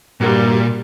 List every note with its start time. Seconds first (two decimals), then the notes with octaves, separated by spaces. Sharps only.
0.21 G2 A#2 G3 F#4 A#4